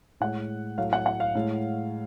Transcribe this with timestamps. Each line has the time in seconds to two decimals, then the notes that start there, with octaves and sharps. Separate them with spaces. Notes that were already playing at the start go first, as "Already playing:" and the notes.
0.20 A2 G#3 F#5
0.78 A2 F#3 A3 F5
0.93 F#5
1.06 F#5
1.20 F5
1.35 A2 G#3